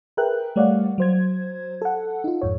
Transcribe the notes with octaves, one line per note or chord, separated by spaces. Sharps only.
G#4 A#4 B4 E5 G5 F#6
G3 A3 C#5 D5 F5 F#5
F#3 C5 G#6
A4 F#5
D#4 F4
F2 G#2 C#5